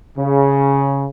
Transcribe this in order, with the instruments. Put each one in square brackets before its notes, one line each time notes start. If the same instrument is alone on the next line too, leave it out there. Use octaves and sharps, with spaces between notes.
[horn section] C#3